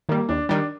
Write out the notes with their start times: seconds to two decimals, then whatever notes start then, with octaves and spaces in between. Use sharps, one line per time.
0.09 D#3 G3 A#3
0.29 D#2 D4
0.49 D#3 G3 D4